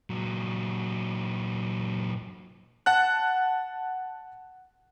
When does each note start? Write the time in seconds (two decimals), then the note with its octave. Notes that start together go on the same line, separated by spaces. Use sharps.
0.10 A#2 F#3
2.86 F#5 A5 F#6